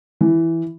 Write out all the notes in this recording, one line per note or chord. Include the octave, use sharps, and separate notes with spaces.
E3